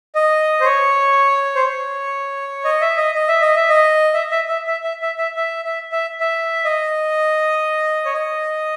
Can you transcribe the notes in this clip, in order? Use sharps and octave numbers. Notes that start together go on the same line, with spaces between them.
D#5
C5
C#5
C5
C#5
D#5
E5
D#5
D#5
E5
D#5
E5
D#5
E5
E5
E5
E5
E5
E5
E5
E5
E5
E5
E5
D#5
C#5
D#5